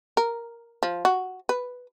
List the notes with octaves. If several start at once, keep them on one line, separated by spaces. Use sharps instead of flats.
A#4
F3
F#4
B4